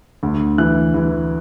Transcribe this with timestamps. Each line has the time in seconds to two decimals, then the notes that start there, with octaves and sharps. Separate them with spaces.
0.23 D2
0.58 E3 F#6
0.94 E3